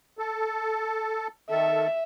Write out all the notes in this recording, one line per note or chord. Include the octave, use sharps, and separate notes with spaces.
A4
D#3 A4 E5